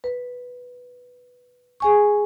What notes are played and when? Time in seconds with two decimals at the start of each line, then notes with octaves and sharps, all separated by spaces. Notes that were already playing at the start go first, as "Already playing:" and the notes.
0.04 B4
1.80 G#4 G#5 C#6